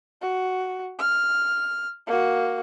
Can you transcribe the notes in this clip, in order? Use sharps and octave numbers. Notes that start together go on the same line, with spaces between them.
F#4
F6
A#3 F#4